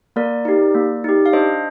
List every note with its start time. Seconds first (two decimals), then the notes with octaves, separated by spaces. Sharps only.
0.16 A#3 A#4 D5
0.45 D#4 G4
0.75 A#3
1.04 D#4 G4
1.26 F5
1.33 D4 C5 D#5